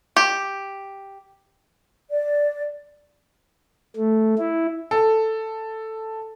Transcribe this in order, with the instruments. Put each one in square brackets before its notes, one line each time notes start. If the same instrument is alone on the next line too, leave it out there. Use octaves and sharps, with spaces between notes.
[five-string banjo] G4
[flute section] D5
[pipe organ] A3
E4
[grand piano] A4